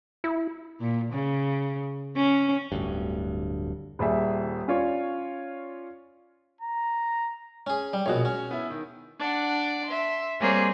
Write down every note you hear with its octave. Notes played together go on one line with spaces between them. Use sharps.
E4
A#2
C#3
C#4
D1 D2 G2
D#1 G3 G#4 E5
C#4 F4 C#5 D5
A#5
C#4 G#4
G3
A#1 B2 F#4 G#4 C#5
C#4
B3 E4
D#3
D4 D5 F#5
E5 C6
G3 A#3 C4 G#4 C#5